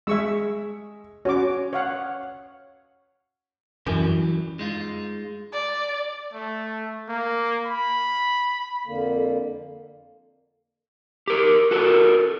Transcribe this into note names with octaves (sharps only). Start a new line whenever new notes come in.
G#3 E5 C#6 E6
C#4 F#4 D6
C#5 F5 F#5
F#2 E3 F#3 G3
G#3 D#4 F4
D5
A3
A#3
B5
F2 D3 A#3
G4 A#4
F#4 A4 A#4